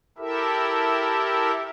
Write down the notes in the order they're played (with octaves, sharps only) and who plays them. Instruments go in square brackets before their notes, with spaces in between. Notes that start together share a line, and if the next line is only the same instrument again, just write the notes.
[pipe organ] E4 G4 A4 A#4 E5